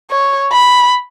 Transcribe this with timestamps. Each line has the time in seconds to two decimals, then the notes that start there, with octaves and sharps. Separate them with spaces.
0.11 C#5
0.53 B5